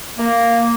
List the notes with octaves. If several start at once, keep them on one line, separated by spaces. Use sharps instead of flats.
A#3